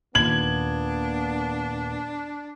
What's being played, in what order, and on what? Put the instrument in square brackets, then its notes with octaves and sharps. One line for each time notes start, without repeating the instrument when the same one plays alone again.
[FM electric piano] D#2 A#2 [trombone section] A#3 B3 [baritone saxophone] D4 [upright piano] G#6 F#7